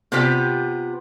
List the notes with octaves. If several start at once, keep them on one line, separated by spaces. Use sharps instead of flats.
C3 B3 F4 G4 C5 G5